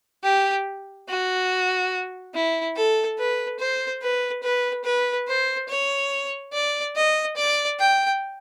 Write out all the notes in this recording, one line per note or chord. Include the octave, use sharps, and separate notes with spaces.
G4
F#4
E4
A4
B4
C5
B4
B4
B4
C5
C#5
D5
D#5
D5
G5